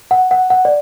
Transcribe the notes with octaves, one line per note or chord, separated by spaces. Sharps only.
F#5
F#5
F#5
D5